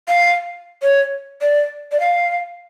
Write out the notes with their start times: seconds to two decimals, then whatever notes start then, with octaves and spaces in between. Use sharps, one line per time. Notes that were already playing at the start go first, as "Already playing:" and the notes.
0.08 F5
0.83 C#5
1.41 D5
1.92 D5
2.00 F5